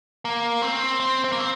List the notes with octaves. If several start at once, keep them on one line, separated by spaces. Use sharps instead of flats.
A#3
C4
C4
C4
A#3
C4